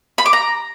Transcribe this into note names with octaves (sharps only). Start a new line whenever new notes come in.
B5
D6
A#5